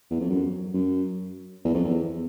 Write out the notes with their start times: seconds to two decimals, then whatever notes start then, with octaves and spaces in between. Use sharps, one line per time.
0.10 E2
0.20 F2
0.29 F#2
0.74 F#2
1.64 E2
1.74 F2
1.84 E2